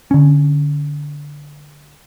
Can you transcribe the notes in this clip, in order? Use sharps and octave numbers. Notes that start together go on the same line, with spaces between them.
D3 C#4